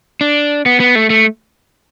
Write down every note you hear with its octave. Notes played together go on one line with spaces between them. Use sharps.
D4
B3
B3
A3
A3